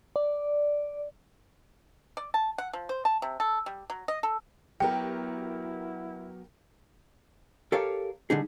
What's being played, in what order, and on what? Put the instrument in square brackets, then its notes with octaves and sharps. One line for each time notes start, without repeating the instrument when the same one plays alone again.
[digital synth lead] D5
[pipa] D5
A5
F#5
F3
C5
A5
C3
A4
G3
F#3
D#5
A4
[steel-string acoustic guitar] F#3 B3 F#4 [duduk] E4 [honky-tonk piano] G4 A#4 [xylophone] G5
[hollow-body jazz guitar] G4 A4 A#4 C#5 F5
D3 G3 D#4 G#4